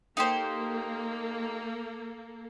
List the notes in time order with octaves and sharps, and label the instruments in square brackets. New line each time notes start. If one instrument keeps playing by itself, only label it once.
[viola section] A#3 A4 [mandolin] D#4 G4 C5